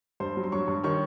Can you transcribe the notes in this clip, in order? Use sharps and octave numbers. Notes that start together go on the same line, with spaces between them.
G2 C5 C6
F#3
C6
G2 C#5 C#6
G2
D#3 C#5 C#6